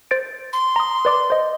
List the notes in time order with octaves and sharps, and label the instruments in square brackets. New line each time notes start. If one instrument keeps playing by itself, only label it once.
[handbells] C5 A6 D7
[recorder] C6
[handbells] A#5 D#6
B4 D5 D6
C5 D#5